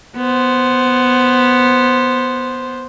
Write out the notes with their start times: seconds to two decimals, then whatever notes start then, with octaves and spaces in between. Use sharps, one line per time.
0.16 B3 C5